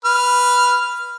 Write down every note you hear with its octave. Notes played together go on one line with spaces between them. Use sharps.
B4 F6